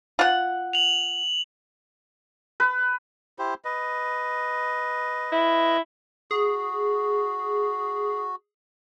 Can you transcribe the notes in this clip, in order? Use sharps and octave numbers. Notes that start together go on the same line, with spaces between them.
F4 F#5
F7 F#7
B4
E4 G4 C5
B4 D#5
E4
F#4 G#4